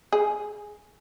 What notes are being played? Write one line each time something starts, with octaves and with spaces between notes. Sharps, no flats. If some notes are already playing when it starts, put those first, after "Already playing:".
G#4